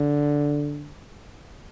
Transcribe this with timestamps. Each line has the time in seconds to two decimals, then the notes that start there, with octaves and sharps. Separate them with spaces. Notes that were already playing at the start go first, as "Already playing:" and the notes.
Already playing: D3